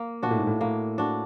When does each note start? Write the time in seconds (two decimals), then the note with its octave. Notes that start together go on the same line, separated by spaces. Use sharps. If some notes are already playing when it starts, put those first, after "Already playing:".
Already playing: A#3
0.23 A#2 D4 F#4
0.31 A2
0.38 G#2
0.47 A2
0.61 A2 A#3
0.98 D4 F#4